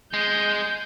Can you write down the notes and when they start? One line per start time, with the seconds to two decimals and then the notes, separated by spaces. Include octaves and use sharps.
0.13 G#3 G6